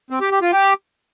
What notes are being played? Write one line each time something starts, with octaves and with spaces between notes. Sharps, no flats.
C4
G4
G4
F4
G4